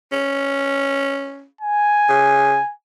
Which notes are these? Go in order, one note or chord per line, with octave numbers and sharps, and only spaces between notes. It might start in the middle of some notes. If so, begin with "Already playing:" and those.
C#4
G#5
C#3